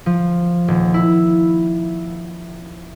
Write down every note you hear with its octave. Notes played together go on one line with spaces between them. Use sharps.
F3
D#1
E4